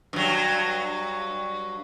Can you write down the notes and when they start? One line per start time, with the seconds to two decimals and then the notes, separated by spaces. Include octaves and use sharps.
0.13 G2 F#3